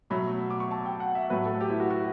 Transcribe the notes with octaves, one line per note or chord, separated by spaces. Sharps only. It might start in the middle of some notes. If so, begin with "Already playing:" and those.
B2 F#3 A3 B5
D6
C#6
A5
G5
F#5
E5
A2 F#3 A3 B4
A4
G4
E4
F#4
F#4